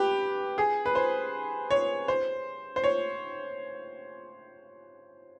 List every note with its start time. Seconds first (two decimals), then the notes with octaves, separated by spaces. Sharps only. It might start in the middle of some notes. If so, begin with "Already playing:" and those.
Already playing: G4 B4
0.58 G#4
0.86 B4
0.95 C5
1.70 C#5
2.08 C5
2.76 C5
2.84 C#5